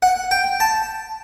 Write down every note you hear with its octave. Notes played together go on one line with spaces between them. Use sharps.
F#5
G5
A5